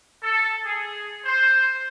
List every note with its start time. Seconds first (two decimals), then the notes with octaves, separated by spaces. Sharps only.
0.23 A4
0.66 G#4
1.26 C5